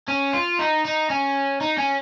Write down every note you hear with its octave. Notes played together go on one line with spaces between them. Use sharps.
C#4
F4
D#4
D#4
C#4
D#4
C#4